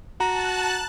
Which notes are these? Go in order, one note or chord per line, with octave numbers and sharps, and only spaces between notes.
F#4 A5 A#5 F#6